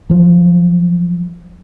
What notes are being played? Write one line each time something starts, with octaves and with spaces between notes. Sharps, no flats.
F3 F#3